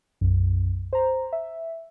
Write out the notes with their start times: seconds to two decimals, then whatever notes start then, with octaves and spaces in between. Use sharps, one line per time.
0.21 B1 F#2
0.93 C5 A#5
1.33 E5